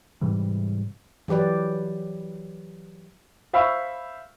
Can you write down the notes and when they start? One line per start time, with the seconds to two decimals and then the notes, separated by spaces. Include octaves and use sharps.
0.21 G#2 C3 E3 G3
1.28 E3 F#3 G4 B4 D5
3.53 C5 E5 F5 B5 C#6 E6